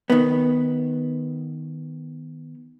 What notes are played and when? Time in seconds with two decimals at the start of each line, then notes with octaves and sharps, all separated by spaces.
0.10 D#3 B3